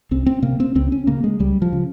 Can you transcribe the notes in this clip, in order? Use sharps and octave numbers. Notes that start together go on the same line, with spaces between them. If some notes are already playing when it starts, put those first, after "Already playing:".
C2 C4
C4
C3 A#3
C4
C#2 C4
C#4
C#3 A#3
G#3
C#2 G3
F3
C#3